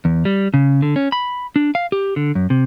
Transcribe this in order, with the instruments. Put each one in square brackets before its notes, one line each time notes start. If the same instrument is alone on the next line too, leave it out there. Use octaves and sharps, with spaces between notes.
[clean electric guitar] E2
G3
C#3
D3
C#4
B5
D4
F5
G4
D3
F#2
C3